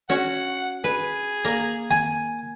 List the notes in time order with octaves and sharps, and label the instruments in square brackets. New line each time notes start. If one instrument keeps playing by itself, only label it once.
[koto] C#4 F#4 [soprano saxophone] F#5
[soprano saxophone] G#4 [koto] B4
[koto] A#3 A#5
[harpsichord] G#5